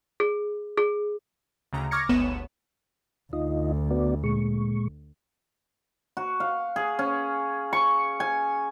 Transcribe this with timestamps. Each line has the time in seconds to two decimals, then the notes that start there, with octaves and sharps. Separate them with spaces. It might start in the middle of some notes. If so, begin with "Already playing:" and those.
0.20 G#4
0.77 G#4
1.73 D2 C#3 A#5
1.91 C#6 D6 F6 G#6 A#6 C#7
2.09 G1 D2 G#2 B3 C#5 E7
3.33 D2 D#4 F4 D#5
3.90 B3 F#4 D5
4.24 A#2 G#3 C#6
6.17 F#4
6.40 F5
6.76 G#4
6.99 C#4
7.73 C#6
8.20 G#5